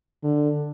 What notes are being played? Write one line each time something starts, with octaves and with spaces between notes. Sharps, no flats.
D3